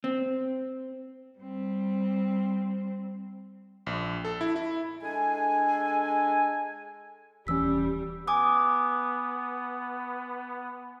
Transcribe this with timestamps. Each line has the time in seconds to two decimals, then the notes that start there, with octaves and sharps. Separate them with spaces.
0.04 C4
1.39 G3 C4
3.87 A#1
4.25 A4
4.41 E4
4.56 E4
5.02 G#3 D4 A4 G#5
7.47 D#1 E3 G3 C#4 E6 B6
8.28 B3 G#5 D6 D#6